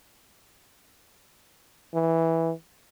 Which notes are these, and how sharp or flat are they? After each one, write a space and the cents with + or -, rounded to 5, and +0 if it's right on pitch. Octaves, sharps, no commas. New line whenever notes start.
E3 -5